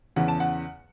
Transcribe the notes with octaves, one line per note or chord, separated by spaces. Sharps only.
E2 C#3 E3 F#5
A5
F#5